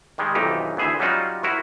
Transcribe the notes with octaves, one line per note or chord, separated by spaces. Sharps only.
D#3 G3 G#3
B1 F2 D#3 E3 D#4 G4
D2 E3 G#4 C5 E5
F#3 G3 C#4 D#4 F4 F#4
E4 F#4 A#4 C5